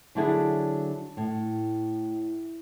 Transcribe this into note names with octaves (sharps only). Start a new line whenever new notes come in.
D3 F#3 D4 E4 F#4 G#4
A2